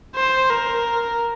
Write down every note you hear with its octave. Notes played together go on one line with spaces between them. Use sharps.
C5
A#4